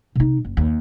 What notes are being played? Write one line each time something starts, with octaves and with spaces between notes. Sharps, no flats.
C3 D#4
F#1
D#2